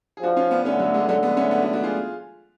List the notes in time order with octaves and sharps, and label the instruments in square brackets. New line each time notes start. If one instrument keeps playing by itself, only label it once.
[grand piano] G#4
[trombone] F3 [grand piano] D4 F#4
[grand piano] C#4 F4
B3 D4
[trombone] D3 [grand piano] A3 C#4
[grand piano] F#3 A3
G#3 B3
[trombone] D3 [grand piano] F#3 A3
[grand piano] G#3 B3
A3 C#4
B3 D4
D4 F#4
D4 F#4
F4 G#4